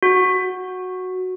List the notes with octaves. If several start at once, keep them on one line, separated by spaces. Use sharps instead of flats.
F#4